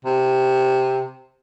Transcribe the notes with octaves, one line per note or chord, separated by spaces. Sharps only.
C3